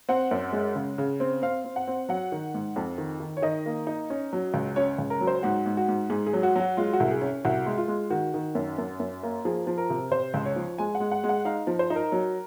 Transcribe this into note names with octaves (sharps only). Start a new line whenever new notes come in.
C4 F#5
F#2
G#3
C#3
C#3
C4
C4 F5
C4
F#5
C4
F#3 F#5
D#3
G#2
F2
D#3
D#3
C#5
D#3 D#5
A#3
D#4
C#4
F#3
C#2
C#4 C#5
C#2
A#4
F#3
C5
G#2 F#4
G#2
F#4
G#2
G#2 G#4
G#4
F#3
F#4
F#3 F#4
G#3 F4
F#4
C2
G#4
C#4
C2 F#4
G#3
F4
G#3
D#3 F#4
D#3
F#2
F#2
F#2
A#3
F3 G#4
F3
A#4
C3
C3 C5
C#2
C#5
F3
G#3 G#5
F#5
G#3
F#5
G#3
F#5
D#4 F5
F3
C5
D#4
A#4
F#3